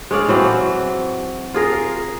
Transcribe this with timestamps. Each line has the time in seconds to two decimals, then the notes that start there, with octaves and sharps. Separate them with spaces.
0.11 G#3 C#5 D5 F5
0.28 E3 F#3 C4
1.54 F4 G#4 A#4